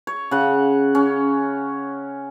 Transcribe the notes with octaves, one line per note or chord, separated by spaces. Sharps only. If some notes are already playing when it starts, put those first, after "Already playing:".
C#5
C#3 F#5
C#4